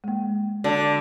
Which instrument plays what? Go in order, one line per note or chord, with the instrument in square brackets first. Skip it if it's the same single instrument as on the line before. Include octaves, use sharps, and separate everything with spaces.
[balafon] G#3 A#3
[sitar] D3 [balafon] F#4